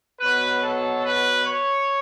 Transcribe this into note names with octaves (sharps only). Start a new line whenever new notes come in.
B2 F#3 B4
A4
B4
C#5